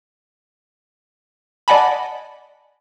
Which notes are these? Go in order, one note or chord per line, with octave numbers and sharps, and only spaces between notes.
D5 D#5 F#5 G#5 A5 B5